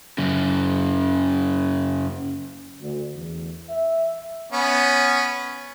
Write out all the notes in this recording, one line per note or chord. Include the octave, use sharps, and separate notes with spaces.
F#2 C#3
D2
E2
E5
B3 C#4